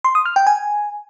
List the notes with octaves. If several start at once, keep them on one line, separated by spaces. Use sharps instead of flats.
C6
D#6
F6
G5
G#5